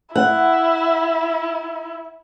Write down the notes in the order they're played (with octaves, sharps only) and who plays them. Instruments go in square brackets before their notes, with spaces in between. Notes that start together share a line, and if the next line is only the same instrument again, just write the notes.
[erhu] E4 [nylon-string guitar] F#5